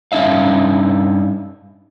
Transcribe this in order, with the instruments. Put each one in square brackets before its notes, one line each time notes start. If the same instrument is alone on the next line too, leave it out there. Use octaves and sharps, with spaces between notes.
[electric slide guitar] G2 C#4 D#4 E5 F5